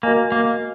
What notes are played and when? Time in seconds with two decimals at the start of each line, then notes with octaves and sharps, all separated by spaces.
0.03 A#3 F#4 A#4 D#5 G#5
0.32 A#3